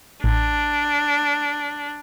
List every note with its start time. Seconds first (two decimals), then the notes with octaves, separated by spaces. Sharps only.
0.24 A1 D4